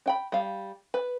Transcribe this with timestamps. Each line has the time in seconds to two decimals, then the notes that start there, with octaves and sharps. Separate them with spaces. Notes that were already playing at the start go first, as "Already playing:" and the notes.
0.06 D4 G5 B5
0.32 G3 F5
0.94 B4